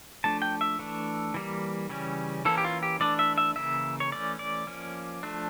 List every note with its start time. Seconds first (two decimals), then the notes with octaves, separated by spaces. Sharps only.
0.24 F3 A3 D4 A5
0.42 G5
0.61 E5
0.79 E3 A3 D4
1.34 E3 G3 A#3
1.89 C#3 E3 G3 C#4
2.45 E3 A#3 C#4 A4
2.58 G4
2.64 F4
2.83 G4
3.00 E3 A3 D4 D5
3.19 E5
3.38 E5
3.56 C#3 E3 A#3 E5
4.00 C#5
4.12 E3 A3 C#4 D5
4.39 D5
4.67 F3 A#3 C#4
5.23 F3 A3 D4